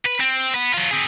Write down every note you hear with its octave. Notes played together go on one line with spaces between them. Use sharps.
B4
C4
B3 B4
F#3 F4
C4 G#4